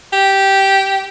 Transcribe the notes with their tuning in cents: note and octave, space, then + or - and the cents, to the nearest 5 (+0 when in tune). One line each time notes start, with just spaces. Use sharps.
G4 -10